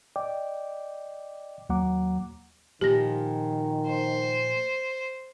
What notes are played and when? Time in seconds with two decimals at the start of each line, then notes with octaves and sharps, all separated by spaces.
0.16 D5 D#5 G5 D6
1.69 D#2 F#3 A#3 F#5 A#5 D6
2.81 A#2 D#3 F3 G4 A#6
3.87 C5